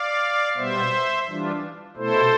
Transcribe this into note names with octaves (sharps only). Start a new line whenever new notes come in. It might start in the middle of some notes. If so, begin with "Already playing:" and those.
Already playing: D5 F5
B2 G3 B3 C5 E5
E3 G3 D4 F4
B2 A3 E4 A4 C5